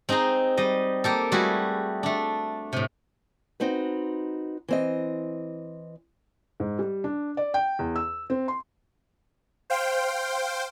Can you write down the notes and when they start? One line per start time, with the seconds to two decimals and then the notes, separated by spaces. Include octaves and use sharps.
0.09 C4 D#4 G#4 A#5 C6
0.57 G3 D#5
1.04 A#3 G4 A4
1.32 G3 A3 E4 F#4 G#4
2.03 A3 D4
2.73 A2 C3
3.60 C4 D#4 F#4 B4
4.68 E3 C4 D#5
6.60 G#2
6.79 G3
7.04 D4
7.37 D5
7.54 G5
7.79 E2
7.96 E6
8.30 C4
8.48 C6
9.70 C5 F5 G5